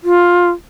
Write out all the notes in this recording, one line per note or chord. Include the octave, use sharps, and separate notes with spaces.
F4